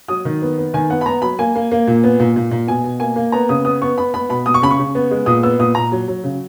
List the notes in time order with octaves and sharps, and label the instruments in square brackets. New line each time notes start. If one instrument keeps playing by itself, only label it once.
[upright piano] F#3 D#6
D#3
B3
B3
D#3 G#5
B3 F#5
B5
B3 A#5
F#3 B5
A#3 G#5
A#3
A#3
A#2
B3
A#2
A#2
A#2
B2 G#5
B2
A#3 G#5
A#3
B3 A#5
C#3 D#6
B3 D#6
B3 C#6
B3 B5
B3 B5
B2 B5
B2 D#6
C#6
C#3 B5
C#6
C#3
B3
G#3
A#2 D#6
B3 E6
A#2 D#6
A#2 A#5
F#3
F#3
C#3